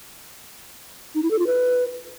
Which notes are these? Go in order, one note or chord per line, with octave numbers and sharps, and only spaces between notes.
D#4
E4
A4
F4
B4